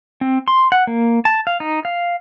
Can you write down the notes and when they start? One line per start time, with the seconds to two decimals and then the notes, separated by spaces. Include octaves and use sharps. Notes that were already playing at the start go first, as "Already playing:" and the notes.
0.21 C4
0.48 C6
0.72 F#5
0.87 A#3
1.25 A5
1.47 F5
1.60 D#4
1.85 F5